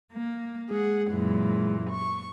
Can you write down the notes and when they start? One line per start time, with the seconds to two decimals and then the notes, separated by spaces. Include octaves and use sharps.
0.11 A#3
0.71 G#3 G#4 F#5
1.10 F#2 A#2 E3
1.90 C#6